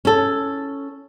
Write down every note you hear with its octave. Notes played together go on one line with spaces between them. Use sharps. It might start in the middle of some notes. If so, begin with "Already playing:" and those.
C#4 A4